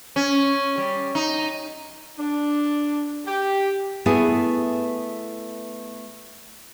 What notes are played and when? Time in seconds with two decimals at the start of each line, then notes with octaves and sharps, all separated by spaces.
0.16 C#4
0.78 G3
1.15 D#4
2.18 D4
3.25 G4
4.06 A3 B3 E4 G#4